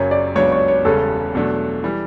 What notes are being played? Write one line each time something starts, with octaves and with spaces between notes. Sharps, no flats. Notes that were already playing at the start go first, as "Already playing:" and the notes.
Already playing: F#1 F#2 C#3 F#3 C#5
D5
C#2 C#3 F#3 B3 D4 C#5
C#5
C#5
E1 E2 C#3 G3 C#4 A4
E2 B2 F#3 A3 D4
E3 G3